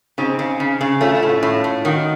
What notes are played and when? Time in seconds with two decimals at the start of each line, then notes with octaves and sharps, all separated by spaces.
0.18 C#3 C4 D#4
0.39 C#3
0.60 C#3
0.81 C#3
1.01 A3 C#4 F4
1.15 C#4 F4
1.23 A2
1.28 C#4 F4
1.43 A2
1.64 A2
1.84 D#3 D#4 F#4